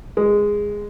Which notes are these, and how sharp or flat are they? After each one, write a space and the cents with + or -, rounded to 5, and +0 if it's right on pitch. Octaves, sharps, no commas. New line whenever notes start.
G#3 -10